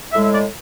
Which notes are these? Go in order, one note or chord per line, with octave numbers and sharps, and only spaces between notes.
A2 G#3 E5
E5
D5